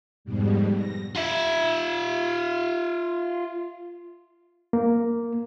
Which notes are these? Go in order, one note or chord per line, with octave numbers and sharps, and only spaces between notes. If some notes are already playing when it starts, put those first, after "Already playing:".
F2 G#2 B2 G3
A#6
F4 E5
A#3